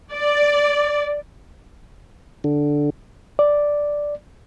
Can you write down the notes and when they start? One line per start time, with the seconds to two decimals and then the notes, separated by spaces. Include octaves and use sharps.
0.12 D5
2.44 D3
3.39 D5